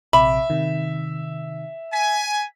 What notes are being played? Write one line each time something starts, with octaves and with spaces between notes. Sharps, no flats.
A#1 C3 E5 B5 D6
C3 D#3
G#5 B6